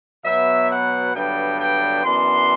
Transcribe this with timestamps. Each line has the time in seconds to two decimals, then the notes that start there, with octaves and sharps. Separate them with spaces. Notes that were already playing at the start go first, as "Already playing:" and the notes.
0.24 B2 F#3 B3 E5
0.70 F#5
1.14 G2 D3 F#3 B3 D4 G5
1.59 G5
2.03 F#2 E3 B3 D4 C6